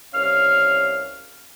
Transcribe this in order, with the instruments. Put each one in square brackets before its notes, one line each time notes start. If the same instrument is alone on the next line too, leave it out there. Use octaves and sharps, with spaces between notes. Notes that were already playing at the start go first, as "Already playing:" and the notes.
[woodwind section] C2 C#4 F5 F6